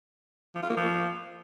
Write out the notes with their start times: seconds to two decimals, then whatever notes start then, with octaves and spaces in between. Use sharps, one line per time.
0.55 F3
0.63 F4
0.70 A#3
0.77 F3